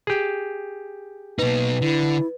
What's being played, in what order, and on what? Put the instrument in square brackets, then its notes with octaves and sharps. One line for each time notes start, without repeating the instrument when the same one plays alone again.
[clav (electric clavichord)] G4 G#4
[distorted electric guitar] B2 D#4 [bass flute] A#3 [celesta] B4
[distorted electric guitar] D3 [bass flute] E4